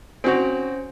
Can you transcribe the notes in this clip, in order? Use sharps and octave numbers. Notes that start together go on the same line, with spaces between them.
C4 C#4 F#4 C5